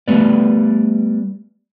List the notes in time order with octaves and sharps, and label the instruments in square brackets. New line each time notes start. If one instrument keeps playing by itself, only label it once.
[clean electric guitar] G3 A3 B3 B4 D5